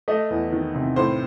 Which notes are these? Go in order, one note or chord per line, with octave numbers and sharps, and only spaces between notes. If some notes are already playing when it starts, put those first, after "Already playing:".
A3 D#5
E2
D#3
C3
A2 C5